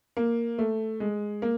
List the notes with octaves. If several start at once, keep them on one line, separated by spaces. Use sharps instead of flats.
A#3
A3
G#3
A#3